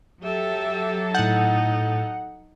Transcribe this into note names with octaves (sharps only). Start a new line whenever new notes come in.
F#3 G4 A4 E5
A2 D#4 F#5 G6